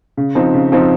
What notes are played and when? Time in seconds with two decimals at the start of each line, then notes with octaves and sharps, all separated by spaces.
0.17 C#3
0.35 F3 C4 D#4
0.54 C#3
0.72 F3 C4 D#4